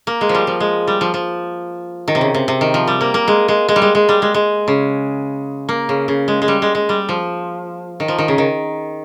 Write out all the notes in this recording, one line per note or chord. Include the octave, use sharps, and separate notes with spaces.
A#3
G#3
F3
G3
F3
G#3
G3
F3
F3
D#3
C3
C#3
C3
C3
D#3
F3
G3
A#3
A#3
G#3
G#3
G#3
G3
G#3
G#3
G3
G#3
G#3
C#3
A#3
C#3
C#3
G#3
G#3
G3
G#3
G#3
G3
F3
D#3
F3
D#3
C#3
D#3